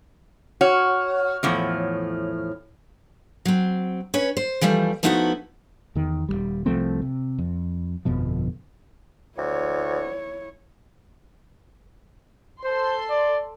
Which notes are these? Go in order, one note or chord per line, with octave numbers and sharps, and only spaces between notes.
F#4 C#5 F6
E2 A2 F3
F#3 C4
C#4 B4 C#5
C5
E3 F3 G3 A3
F3 A3 B3 D#4 E4 F#4
E2 D#3
D#1 D#2 G3
C2 F3 A3 C4
C3
F2
G1 F2 B2 F3
D2 E4 C#5
A4 C5 C6
D5